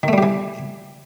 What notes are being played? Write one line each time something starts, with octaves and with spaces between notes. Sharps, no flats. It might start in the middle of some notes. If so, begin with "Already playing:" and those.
D#3 E3 G3 A3 G4